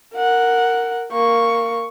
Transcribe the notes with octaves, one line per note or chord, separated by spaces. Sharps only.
A#4 F#5
A#3 C#6